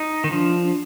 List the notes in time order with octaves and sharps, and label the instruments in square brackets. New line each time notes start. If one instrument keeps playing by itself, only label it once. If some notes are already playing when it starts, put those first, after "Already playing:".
Already playing: [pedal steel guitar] D#4
D#3
[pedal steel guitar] F3 [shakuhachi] D4